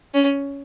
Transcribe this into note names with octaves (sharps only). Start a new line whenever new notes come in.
C#4